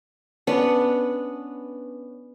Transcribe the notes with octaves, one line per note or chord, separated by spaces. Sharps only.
B3 C#4 D4